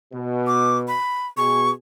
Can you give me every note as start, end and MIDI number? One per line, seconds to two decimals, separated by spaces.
0.13 0.95 47
0.47 0.77 86
0.88 1.27 83
1.37 1.71 47
1.37 1.71 68
1.37 1.70 85